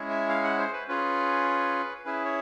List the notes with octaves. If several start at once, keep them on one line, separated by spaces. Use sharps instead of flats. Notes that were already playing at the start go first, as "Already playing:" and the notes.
Already playing: G#3 C#4 E4 G#4
E5
F5
F#5
C5
B4
C#4 F4 G#4 B4
C#4 E4 G#4 B4
C#5